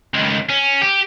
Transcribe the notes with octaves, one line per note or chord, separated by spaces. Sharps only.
C#2 D#3
C#4
G4